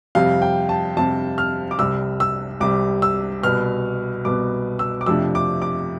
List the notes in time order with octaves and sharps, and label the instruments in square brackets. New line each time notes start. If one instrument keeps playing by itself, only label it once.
[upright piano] F2 C3 G3 C4 F5
G5
A5
F2 C3 G3 C4 A5
F6
D6
C2 C3 G3 E6
E6
C2 C3 G3 D6
E6
C2 B2 B3 F6
C2 B2 B3 D6
E6
D6
F2 C3 F3 A3 D4 E6
D6
D6